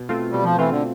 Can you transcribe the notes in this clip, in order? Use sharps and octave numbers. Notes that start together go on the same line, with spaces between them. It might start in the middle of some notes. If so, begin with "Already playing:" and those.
Already playing: B2
A3 C4 F4
B2 G3
F3
E3 A3 C4 F4
D3